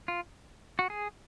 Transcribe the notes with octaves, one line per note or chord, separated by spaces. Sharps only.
F4
F#4
G#4